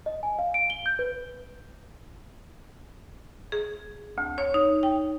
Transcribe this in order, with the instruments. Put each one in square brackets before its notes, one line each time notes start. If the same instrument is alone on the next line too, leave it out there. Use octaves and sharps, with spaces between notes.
[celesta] D#5
G#5
F5
D7
G7
G6
B4
[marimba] G#4
D2
C#5
D#4
G5